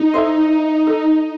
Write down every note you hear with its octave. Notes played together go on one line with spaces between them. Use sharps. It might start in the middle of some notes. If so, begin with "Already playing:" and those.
Already playing: D#4
E4 A4 C5 E5
A4